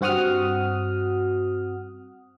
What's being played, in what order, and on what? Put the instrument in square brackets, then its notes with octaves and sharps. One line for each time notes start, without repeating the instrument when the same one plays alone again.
[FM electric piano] G2 C4 F#4 F#5 D#6 F6